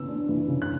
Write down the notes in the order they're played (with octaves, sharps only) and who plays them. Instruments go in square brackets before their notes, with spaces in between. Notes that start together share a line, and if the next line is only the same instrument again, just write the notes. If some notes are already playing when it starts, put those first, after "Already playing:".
Already playing: [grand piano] C#3 E3 B3 E6
D4
E3
C#3
F#6